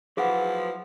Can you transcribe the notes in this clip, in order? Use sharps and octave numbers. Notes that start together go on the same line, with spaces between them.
F3 F#3 E4 G#4 B4 F#5